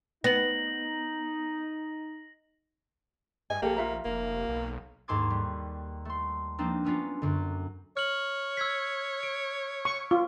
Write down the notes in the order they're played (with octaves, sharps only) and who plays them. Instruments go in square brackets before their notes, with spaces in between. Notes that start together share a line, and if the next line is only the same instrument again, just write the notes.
[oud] B3 [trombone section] D#4 [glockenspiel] A#6 F#7
[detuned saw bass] G2 [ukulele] D#5 [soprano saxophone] G#5
[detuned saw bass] A#1 [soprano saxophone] A#3 [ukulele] G4 A4
[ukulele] F4 E5 A#5
[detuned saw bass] F1 [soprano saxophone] A#3
[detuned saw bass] B1
[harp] D#2 G#2 A4 C6 D6 G#6
G3
A3 C6
F3 A#3 C4 D4 D#4
F#3 B3 C#4 D4 F4
F#2 D3
[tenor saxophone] C#5 [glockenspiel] F6 F#7
[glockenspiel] E6 G#6 B6
D7
[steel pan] C#6
[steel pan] F4 [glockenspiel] C#6